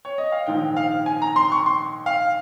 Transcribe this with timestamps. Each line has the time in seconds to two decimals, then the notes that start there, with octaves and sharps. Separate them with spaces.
0.05 C#5
0.18 D#5
0.32 F5
0.46 A#1 G#2 D#3 G5
0.76 F5
1.06 G#5
1.22 A#5
1.36 C6
1.52 C#6
1.66 C6
2.06 F5